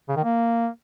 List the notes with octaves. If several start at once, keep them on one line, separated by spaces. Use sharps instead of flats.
C#3
D#3
A#3